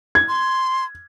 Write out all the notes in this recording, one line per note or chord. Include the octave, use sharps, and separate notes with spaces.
G#6
C6